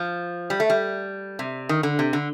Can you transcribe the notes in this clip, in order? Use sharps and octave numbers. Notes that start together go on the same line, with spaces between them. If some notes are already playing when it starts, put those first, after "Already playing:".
Already playing: F3
G3
A3
G3
C3
D#3
D3
C3
D3